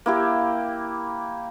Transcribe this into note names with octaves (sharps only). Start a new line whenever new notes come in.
A#3 E4 G4